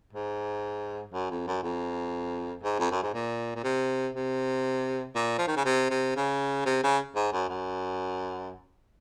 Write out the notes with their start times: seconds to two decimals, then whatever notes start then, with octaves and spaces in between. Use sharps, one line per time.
0.13 G#2
1.13 F#2
1.30 F2
1.47 F#2
1.63 F2
2.63 G#2
2.79 F2
2.91 F#2
3.03 G#2
3.14 A#2
3.55 A#2
3.64 C3
4.15 C3
5.15 A#2
5.38 F3
5.47 D#3
5.56 C#3
5.65 C3
5.90 C3
6.16 C#3
6.65 C3
6.83 C#3
7.15 G#2
7.33 F#2
7.49 F#2